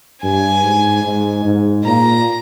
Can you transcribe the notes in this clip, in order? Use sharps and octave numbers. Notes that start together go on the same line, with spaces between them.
G2 G#5
G#2
G#2
G#2
A#2 A#5